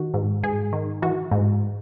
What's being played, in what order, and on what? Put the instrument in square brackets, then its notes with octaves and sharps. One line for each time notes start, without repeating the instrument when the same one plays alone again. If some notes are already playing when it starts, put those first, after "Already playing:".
Already playing: [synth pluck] D#3 F#4
G#2
G#2 G#4
D#3
E3 F#4
G#2